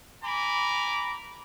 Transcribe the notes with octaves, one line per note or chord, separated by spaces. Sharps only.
G#5 A#5 B5 D6